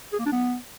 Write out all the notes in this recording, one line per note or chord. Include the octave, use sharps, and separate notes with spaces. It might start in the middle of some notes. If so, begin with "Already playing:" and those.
G#4
A#3
D4
B3